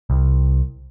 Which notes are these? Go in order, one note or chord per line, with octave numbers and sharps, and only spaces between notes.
C2